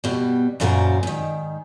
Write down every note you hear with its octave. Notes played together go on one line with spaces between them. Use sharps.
B2 G3
F#2 A#2 C#3 F#4 C5 D5
G#2 D#3